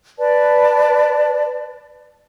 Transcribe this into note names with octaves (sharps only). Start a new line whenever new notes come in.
B4 D5 A5